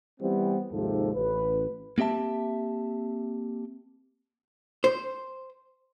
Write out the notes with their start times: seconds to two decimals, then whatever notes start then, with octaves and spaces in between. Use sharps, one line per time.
0.21 E3 G3 B3 C4
0.72 D#2 G#2 C3 F3 A4
1.15 A1 B4
1.98 A#3 C4 G4 E5 A5
4.84 C5